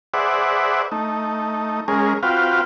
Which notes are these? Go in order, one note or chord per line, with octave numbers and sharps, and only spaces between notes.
G#4 B4 C5 D5 E5 F#5
A3 D#4
G#3 C#4 G#4 A#4
C4 F4 F#4 B4 F5 G5